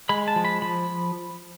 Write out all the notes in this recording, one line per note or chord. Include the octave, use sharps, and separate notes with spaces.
G#3 B5
A5
F3
B5
F3 B5